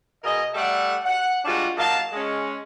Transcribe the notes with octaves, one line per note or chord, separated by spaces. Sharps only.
B2 G#4 A#4 D#5
G3 A3 A4 D5 E5 F#5
F#5
G3 G#3 D4 F4 F#4
F#3 A#3 D#4 F5 A5
G#3 C#4